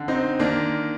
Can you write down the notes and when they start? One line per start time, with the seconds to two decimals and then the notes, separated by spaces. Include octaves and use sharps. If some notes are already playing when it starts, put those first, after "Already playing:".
Already playing: D3
0.08 C4 D#4
0.39 D#3 A#3 D4